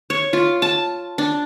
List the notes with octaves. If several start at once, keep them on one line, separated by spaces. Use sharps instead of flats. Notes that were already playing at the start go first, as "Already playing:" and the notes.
C#5
F4
A5
D4